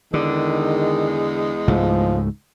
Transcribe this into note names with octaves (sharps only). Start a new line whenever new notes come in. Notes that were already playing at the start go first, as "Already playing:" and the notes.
E2 D3 D#3 G#3
C#2 G#2 F3 A3